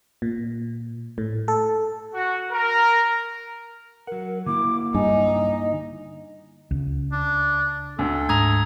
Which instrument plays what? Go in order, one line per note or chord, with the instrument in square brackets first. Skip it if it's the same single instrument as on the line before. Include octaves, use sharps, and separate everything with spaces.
[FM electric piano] A#2
A2
A4
[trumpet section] F#4
A#4
[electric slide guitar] F#3 F#5 [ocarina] A#4
[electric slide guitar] D3 A#3 E4 [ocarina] D6
[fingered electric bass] G2 [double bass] D#4 [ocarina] G#5
[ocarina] D#5
[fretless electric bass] C#2
[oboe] D4
[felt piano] D2 [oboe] A4
[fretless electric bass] G#2 [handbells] A#5 D#6 G#6